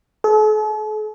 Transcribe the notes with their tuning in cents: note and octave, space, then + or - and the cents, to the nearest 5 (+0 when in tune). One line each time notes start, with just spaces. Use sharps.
A4 -45